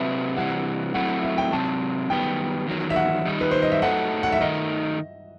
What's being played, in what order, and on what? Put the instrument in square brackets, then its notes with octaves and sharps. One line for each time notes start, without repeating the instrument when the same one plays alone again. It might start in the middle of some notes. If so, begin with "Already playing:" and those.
Already playing: [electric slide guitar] C3 F#3 C4 F#4 B4 [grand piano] E5
[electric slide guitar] C3 E3 G3 [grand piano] F#5
[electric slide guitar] F#3 A3 C4 E4 [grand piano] F#5
[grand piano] E5
G5
[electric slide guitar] C3 F#3 C4 [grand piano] A5
[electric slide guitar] F#2 D#3 G3 B3 [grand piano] G5
[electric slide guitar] E2 D#3 F#3
[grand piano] E5
F#5
[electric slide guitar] D#3 G3 D#4
[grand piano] B4
C5
D#5
E5
[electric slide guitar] F#3 A3 D#4 A4 [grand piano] F#5
[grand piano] F#5
E5
[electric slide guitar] D#3 A3 D#4 [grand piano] D#5